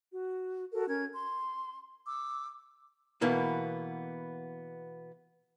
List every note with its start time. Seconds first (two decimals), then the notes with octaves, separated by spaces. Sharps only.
0.11 F#4
0.72 F#4 A4 A#4
0.88 C#4 A#4 G#6
1.12 C6
2.07 D6 E6
3.21 B2 E3 A#3 B3